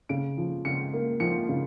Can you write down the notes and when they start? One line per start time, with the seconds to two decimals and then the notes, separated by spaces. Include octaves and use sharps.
0.09 C#3 D7
0.38 F3
0.65 C#3 C#7
0.93 A#3
1.20 F3 C#7
1.49 C#3